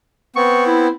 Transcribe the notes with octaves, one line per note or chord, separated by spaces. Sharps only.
B3 C4 C#6
E4